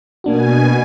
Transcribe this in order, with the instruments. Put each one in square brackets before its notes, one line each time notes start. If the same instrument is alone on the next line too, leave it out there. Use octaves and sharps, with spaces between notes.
[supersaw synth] B2 G#5 [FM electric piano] A#3 D4 F#4